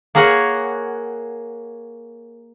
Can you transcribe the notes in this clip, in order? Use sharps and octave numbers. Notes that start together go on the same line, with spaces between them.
A#3 G#4 A#4 C#5 F#5